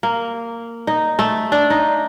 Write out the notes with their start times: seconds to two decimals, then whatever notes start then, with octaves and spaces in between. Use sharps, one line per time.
0.03 A#3
0.87 D#4
1.19 A3
1.52 D4
1.70 D#4